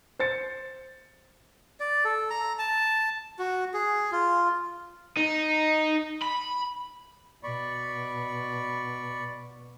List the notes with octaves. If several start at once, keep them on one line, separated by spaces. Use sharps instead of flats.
C5 A6 C#7
D5
A4
A#5
A5
F#4
G#4
F4
D#4
B5
B2 D5 B5 C#6